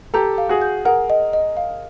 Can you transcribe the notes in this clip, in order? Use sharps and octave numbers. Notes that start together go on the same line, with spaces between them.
G4 A4 A#5
F5
F#4 G#4
G6
G#4 A#4 F#5
D#5
D#5
F5